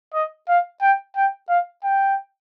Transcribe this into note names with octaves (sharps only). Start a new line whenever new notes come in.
D#5
F5
G5
G5
F5
G5